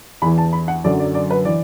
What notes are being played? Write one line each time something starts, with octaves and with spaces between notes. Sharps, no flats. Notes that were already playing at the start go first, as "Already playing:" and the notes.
E2 E3 B5
A5
B5
F#5
F#2 D3 F#3 D5
D5
D5
B4
E3 D5